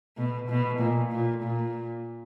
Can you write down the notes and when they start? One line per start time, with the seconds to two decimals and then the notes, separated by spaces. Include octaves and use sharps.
0.17 B2
0.49 B2
0.80 A#2
1.12 A#2
1.43 A#2